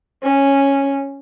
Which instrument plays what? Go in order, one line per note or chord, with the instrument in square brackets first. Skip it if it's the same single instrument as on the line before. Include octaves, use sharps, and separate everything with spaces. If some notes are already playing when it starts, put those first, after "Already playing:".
[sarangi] C#4